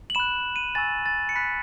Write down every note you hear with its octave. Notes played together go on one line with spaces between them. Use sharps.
F#7
B5 F#6 E7
D#7
G#5 C#6 E6 A6
A6
C#7
B5 F#6 B6